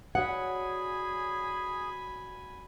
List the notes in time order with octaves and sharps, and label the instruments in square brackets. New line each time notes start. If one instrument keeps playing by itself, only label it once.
[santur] F#3 D5 [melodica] G#4 [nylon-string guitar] F#5 [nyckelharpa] G#5 B5